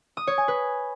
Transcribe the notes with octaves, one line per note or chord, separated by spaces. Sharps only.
D#6
C#5
G#5
B4